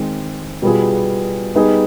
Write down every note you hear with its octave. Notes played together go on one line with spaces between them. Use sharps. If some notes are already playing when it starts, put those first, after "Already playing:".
Already playing: D#3 G#3 C4
B2 G3 B3 F4 G#4
G3 B3 D#4 G#4